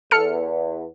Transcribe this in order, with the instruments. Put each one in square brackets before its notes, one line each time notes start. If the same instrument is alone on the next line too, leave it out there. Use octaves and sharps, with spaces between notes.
[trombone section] E2 [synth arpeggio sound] A4 F6 C#7